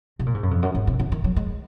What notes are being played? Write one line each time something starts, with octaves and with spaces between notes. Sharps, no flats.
C3
A#2
G#2
F#2
F2
F#2
G#2
C3
C#3
D#3
F#3
G#3